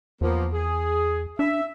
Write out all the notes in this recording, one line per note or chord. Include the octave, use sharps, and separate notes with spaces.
E2 F3 A#3 B3
G#4
D4 E5